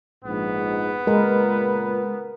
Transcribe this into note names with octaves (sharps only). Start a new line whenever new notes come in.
A#1 G#2 B3
C#2 A#2 G#3 A#4 B4